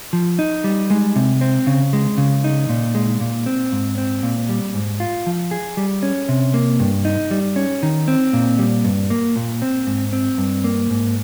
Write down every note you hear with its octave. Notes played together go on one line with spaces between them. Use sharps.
F3
D#4
G3
G#3
C3
C4
C#3
G#3
C#3
D#4
A#2
G#3
A#2
C4
G#2
C4
A#2
G3
G#2
F4
F3
G#4
G3
C#4
C3
A#3
G2
D#4
G3
C#4
D#3
C4
A#2
G3
G2
A#3
A#2
C4
G#2
C4
G2
A#3
G#2